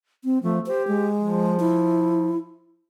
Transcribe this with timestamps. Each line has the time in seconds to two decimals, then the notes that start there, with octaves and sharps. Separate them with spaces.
0.24 C4
0.43 F3 A3
0.66 G4 C5
0.88 G#3
1.20 F3
1.60 E4